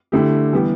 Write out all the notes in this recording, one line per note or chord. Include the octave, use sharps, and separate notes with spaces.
D3 A3 E4 G4
E3 G3 B3 G4